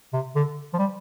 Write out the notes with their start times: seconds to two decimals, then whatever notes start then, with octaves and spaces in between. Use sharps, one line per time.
0.13 C3
0.36 D3
0.74 F3
0.79 G3